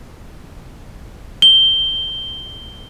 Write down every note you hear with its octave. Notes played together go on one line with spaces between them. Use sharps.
G7